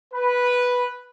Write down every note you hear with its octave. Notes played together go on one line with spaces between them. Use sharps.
B4